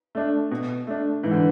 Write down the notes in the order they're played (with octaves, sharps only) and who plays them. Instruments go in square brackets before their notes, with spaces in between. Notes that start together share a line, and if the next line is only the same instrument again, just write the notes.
[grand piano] A3 D4
B2
A3 D4
[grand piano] G#2 [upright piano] E3
[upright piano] D3